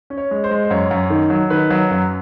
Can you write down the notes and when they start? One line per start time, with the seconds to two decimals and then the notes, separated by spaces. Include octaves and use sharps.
0.10 C#4
0.17 C#5
0.31 G#3
0.44 C5
0.51 G#3
0.65 C5
0.71 F#2 C#5
0.91 F#2
1.10 D#3
1.30 F#3
1.50 D#3 B4
1.70 F#3
1.91 F#2